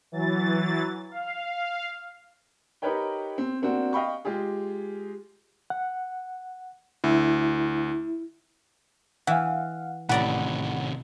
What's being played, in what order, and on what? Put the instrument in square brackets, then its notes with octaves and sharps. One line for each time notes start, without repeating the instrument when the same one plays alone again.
[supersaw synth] E3 F#3 A6
F5
[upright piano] D#4 G4 A#4 B4 C#5 G5
C4
A#3 C4 D4 F#4
D#5 F5 G5 B5 C#6
G#3 F4 G4 G#4
[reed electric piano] F#5
[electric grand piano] D2 [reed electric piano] E4
[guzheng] E3 [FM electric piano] F5 F#5
[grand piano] A1 [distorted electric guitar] C3 D#3 [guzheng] B4 D5 A#5 [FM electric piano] F#5